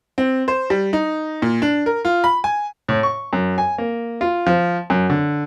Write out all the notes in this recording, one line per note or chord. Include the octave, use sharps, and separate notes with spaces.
C4
C5
G3
D#4
A#2
D4
A#4
F4
B5
G#5
A2
C#6
F#2
G#5
A#3
F4
F3
F#2
D3